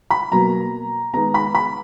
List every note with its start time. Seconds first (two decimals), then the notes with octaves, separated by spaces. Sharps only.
0.10 B5
0.32 B2 F#3 A#3 A#5
1.13 D#3 G#3 B3 A#5
1.34 B5
1.55 B5